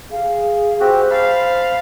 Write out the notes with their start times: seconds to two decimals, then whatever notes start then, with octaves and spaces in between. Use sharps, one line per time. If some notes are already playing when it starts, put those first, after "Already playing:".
0.12 G#4 F5
0.80 C4 F#4 G4 C5
1.11 F5 A5 B5